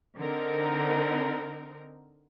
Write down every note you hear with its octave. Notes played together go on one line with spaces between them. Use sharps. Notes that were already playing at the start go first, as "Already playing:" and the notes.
D3 C4 D#4 A#4